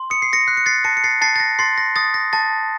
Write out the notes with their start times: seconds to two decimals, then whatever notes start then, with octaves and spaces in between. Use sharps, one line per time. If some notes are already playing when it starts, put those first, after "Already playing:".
Already playing: C6
0.10 D#6 C#7
0.22 C7
0.33 A#6 C#7
0.48 F#6 C7
0.57 C#7
0.66 A6 C7
0.84 A5 A#6 C#7
0.97 C#7
1.04 A6 C7
1.21 A5 A6 C7
1.36 A6
1.40 A#6
1.59 C6 A6 C7
1.78 A#6
1.96 D#6 A6
2.14 A#6
2.33 A5 A6